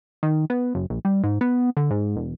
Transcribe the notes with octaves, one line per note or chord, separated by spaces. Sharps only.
D#3
B3
F#1
A#1
G3
G#2
B3
D3
G#2
E1